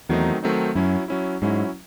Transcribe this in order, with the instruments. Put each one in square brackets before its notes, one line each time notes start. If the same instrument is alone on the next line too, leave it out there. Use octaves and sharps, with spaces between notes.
[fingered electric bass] E2 [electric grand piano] D#3 F#3 A3 C4 D#4
[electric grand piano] D#3 F#3 A3 C4 D#4
[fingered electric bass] F#2 [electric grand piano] F#3 C#4 E4
[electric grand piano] F#3 C#4 E4
[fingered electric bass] G#2 [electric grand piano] F#3 C#4 E4